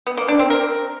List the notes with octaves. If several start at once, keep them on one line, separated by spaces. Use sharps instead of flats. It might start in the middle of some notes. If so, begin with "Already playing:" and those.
B3
A#3
D4
C4
A#4